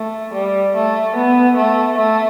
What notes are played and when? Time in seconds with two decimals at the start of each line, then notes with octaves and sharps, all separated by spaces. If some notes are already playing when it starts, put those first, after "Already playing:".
Already playing: A3
0.33 G3
0.75 A3
1.16 B3
1.57 A3
1.98 A3